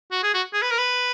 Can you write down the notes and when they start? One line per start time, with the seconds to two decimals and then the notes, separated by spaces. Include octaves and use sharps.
0.12 F#4
0.23 G#4
0.34 F#4
0.53 G#4
0.62 B4
0.71 A#4
0.78 B4